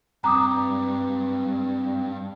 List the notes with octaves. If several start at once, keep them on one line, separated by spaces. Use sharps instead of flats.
G2 C4 A#5 D6 D#6